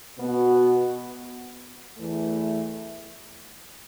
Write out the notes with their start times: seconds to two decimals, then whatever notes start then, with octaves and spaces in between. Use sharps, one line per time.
0.17 B2 B3 F#4
1.97 E2 E3 A3